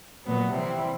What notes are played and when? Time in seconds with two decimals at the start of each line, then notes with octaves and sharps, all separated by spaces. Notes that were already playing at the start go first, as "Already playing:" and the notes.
0.24 A#2 F#3 B3
0.52 C3 E3 G3 C4 E4